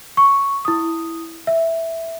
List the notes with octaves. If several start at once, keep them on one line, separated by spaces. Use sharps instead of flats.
C#6
E4 D#6
E5